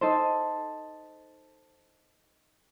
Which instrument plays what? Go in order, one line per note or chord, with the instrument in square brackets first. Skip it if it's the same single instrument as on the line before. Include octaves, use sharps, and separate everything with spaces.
[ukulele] D#4 A4 C5